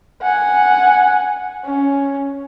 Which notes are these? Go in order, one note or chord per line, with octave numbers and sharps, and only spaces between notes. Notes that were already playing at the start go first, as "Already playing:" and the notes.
F#5 G#5
C#4